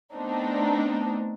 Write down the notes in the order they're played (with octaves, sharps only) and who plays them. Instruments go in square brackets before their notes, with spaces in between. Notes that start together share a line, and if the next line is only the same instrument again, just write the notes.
[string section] A3 B3 C4 D4 D#4